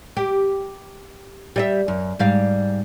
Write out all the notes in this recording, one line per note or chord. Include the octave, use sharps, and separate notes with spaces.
G4
G3 D#5 E5
F#2
G#2 G3 F5